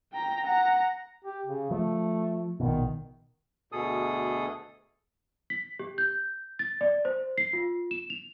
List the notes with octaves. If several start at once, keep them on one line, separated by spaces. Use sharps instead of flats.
G5 A#5
F#5 A#5
G4
C#3
F3 A3
A#1 B2 D#3
D2 B2 G#4 A4 D#6
B6
G4
G6
A6
D5
C5
C7
F4
E7
F7